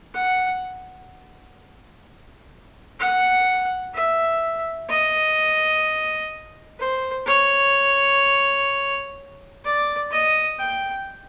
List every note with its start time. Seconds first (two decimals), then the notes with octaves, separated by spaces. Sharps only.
0.14 F#5
3.00 F#5
3.94 E5
4.89 D#5
6.79 C5
7.26 C#5
9.64 D5
10.11 D#5
10.59 G5